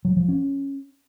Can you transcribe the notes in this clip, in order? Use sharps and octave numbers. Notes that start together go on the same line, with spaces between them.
F#3
F3
C#4